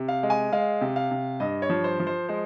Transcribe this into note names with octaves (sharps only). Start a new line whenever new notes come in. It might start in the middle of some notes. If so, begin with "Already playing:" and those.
Already playing: C3
F5
G#3
G#5
G#3 F5
C3
F5
C3
G2 D#5
C#5
F3
C5
F3
C5
G#3 C5